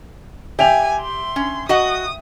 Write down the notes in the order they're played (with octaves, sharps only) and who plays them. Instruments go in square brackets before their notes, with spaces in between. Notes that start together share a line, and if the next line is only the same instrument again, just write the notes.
[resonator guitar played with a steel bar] G4 [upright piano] E5 G5 F7 [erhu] G#5
[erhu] C6
[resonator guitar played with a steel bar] C#4
[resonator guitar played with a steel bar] F#4 D#5 F#5 [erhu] D#6